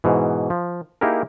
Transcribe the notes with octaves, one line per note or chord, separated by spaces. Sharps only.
G#2 B2 E3
F3
A#3 D#4 E4 G4 G#4 A#4